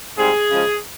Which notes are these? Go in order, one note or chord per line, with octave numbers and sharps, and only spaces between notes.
G#2 G3 C4 G#4
C#3 F3 G#3